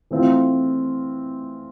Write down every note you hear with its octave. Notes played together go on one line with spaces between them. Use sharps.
E3 A3 C4 F4